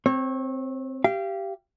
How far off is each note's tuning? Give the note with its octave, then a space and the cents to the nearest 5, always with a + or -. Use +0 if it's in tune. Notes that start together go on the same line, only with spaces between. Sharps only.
C4 +0 C#5 -30
G4 -5 F5 -30